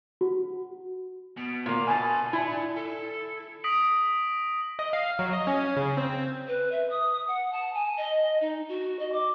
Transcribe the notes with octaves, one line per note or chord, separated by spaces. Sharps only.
F#4
B2
A#2 A#3
B2 D4 G#5 A5
E4 F4 D5
A4
D#6 A#6 B6 D7 F#7
D#5
F5
F#3
D#5
C#4
C#3
C4
B4
E5
D#6
F#5
A5
G#5
D#5
D#4
F#4
D#5
D6